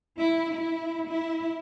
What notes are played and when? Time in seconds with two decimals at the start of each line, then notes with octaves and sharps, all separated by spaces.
0.17 E4
0.53 E4
1.07 E4